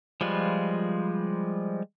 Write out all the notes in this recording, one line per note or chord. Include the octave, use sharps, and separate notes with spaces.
F3 G3 G#3 F4 B4